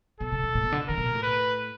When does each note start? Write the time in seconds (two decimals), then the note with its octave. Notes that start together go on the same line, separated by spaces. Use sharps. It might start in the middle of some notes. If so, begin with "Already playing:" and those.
0.20 B2 A4
0.32 C3
0.43 C3
0.55 A#2
0.63 B2
0.72 D3
0.88 D#3 A#4
0.98 B2
1.06 A#2
1.15 A2
1.23 B4